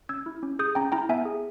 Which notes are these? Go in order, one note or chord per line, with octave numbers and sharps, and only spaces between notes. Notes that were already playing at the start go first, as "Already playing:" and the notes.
C#4 E6 G#6
E4
C#4
G#4 D#6 G6
C#4 G5 A#5
E4 G5 A#5
B3 E5 G#5
G#4